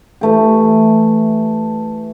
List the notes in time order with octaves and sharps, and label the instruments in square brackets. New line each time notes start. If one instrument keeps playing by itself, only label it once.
[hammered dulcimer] E3 A3 G4